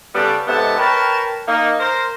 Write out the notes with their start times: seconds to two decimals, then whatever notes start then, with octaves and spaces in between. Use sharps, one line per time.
0.15 C#3 G3 B3 A4 D5
0.47 G#2 C3 B3 A4 A5
0.78 A#4 B4 C#5 G5 A5
1.48 A#3 D#4
1.80 A#4 C5